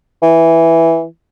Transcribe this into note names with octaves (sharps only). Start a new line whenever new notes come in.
E3